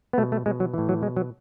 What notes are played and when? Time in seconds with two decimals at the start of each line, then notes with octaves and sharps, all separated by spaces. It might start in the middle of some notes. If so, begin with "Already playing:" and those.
0.13 B3
0.18 B2 A3
0.32 A3
0.46 B2 G#3
0.60 F#3
0.74 A2 E3
0.89 F#3
1.02 B2 G#3
1.17 F#3